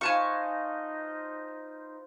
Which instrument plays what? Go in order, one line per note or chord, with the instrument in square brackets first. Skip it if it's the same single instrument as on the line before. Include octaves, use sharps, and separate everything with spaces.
[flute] D#4 [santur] F4 B4 C5 [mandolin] G#5 A5 C#6